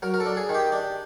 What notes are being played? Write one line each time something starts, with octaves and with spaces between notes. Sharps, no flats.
F#3 A#4
A#4
A4
D4
G#4
D#3
G4
D4